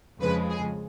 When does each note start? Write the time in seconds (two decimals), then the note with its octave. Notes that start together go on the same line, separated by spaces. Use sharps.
0.21 F2 C#3 F3 G#3 B4
0.50 G#4